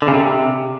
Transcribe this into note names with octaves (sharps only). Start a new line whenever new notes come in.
D3
C#3
C3